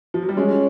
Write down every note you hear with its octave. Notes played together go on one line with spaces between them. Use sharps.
F3
F#3
G3
G#3 C#4